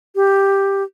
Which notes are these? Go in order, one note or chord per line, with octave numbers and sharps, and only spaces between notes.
G4